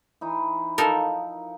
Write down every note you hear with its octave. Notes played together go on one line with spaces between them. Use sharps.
E3 D#4
F3 D#4 A4 A#4